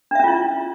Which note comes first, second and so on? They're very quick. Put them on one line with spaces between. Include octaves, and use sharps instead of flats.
D4 E5 C#4 F4 E4